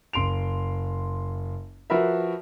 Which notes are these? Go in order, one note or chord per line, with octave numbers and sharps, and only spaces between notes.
F#1 C6 D7 F7
F3 F#4 A#4 B4 E5